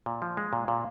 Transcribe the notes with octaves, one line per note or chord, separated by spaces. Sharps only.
A#2
F3
G#3
A#2
A#2